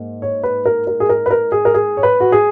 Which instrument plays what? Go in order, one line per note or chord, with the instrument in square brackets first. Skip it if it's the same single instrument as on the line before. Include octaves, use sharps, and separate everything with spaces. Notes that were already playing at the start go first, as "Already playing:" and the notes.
Already playing: [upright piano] G#2 A#3
C#5
B4
A#4
A#4
G#4
A#4
B4
A#4
G#4
A#4
G#4
C#5
B4
F#4
G#4